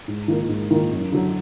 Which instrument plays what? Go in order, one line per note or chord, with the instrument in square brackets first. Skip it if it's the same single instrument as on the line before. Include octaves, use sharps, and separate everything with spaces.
[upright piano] G#2
D#3 A#3 F4 A#4
G#2
D#3 A#3 F4 A#4
F#2
D3 F#3